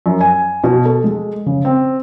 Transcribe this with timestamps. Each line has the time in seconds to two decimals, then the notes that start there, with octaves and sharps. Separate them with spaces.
0.06 F#2
0.21 G#5
0.64 B2
0.85 A4
1.04 G#3
1.46 C#3
1.65 C4